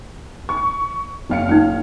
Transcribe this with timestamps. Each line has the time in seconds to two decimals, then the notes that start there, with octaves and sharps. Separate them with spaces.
0.49 C#6
1.30 F#1 F5 C#7
1.49 C#4 D#4